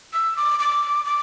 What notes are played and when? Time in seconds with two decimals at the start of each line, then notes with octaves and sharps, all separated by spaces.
0.13 E6
0.37 D6
0.60 D6
1.05 D6